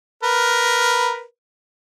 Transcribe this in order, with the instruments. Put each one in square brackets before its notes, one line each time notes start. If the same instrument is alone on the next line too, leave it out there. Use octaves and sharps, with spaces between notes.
[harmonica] A#4 B4